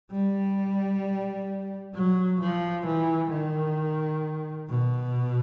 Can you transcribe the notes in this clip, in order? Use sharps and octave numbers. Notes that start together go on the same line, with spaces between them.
G3
F#3
F3
E3
D#3
B2